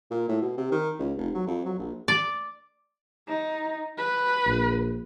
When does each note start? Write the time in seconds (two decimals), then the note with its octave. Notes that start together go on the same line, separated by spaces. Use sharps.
0.11 A#2
0.28 A2
0.41 B2
0.57 C3
0.72 D#3
0.99 C#2
1.17 F1
1.34 F#3
1.47 F2
1.65 F#3
1.79 A#1
2.08 D5
3.28 D#4
3.98 B4
4.46 A#1